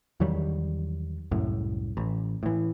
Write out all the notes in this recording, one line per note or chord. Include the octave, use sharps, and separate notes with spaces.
E2 D#3 F#3 G3
C2 F#2 A2
A1
A2 E3